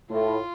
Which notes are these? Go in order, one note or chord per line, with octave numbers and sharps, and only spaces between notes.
A2 F4